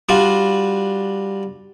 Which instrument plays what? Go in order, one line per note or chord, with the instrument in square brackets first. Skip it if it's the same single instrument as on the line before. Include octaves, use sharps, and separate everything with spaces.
[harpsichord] G3 D4 F4 F#4